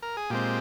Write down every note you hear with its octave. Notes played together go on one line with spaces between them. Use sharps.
A#4
G#4
A#2 G#3 C4 G4